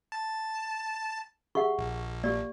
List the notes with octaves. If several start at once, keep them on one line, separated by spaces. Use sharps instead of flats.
A5
G4 G#4 E5 F#5 C#6
A#1
A#3 G4 D5